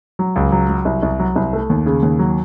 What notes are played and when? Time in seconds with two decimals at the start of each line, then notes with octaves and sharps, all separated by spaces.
0.19 F#3
0.36 C#2
0.52 F#3
0.69 F#3
0.85 C2
1.02 C2
1.19 F#3
1.36 C2
1.53 A3
1.70 D#2
1.86 C#3
2.02 D#2
2.19 F#3